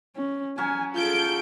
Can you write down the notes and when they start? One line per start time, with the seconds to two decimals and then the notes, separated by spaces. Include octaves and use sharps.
0.16 C#4
0.58 F#3 C#4 G#5
0.95 F4 G#4 A4 G6 D7